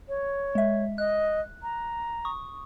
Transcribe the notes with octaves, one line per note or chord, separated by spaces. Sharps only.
C#5
G#3 E5
D#5 F#6
A#5
C#6 D#6